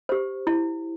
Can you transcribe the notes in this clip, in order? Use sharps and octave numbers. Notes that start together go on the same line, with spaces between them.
G4 C5
E4